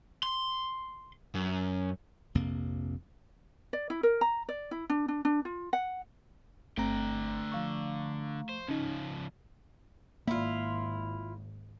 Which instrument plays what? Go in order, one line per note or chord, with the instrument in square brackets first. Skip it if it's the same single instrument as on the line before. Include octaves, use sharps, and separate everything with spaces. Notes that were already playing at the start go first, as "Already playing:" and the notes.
[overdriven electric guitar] C6
F#2
[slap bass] A#1 F2 C3 A#3
[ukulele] D5
E4
A#4
A#5
D5
E4
D4
D4
D4
F4
F#5
[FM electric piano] G1 C4 A#6 [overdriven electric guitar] D3 G5 [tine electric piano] A3 A#5
[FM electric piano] F3 F5 C#6
[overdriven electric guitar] C5
[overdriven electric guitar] C#3 F3 [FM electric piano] C#4 D#4
[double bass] G#1 [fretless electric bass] A#3 [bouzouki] E4 F4